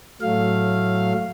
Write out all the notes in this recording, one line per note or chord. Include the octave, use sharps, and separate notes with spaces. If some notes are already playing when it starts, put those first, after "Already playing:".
A2 F#3 A3 F5